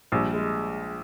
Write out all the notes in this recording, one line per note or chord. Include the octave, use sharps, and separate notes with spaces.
A#1 G3
G#3